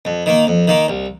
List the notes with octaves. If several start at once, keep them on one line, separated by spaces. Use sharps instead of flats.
F2
D#3 A#3
F2
D#3 A#3
C2